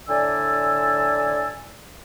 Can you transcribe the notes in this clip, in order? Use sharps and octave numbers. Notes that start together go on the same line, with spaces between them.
A2 D3 D5 G#5 A5 E6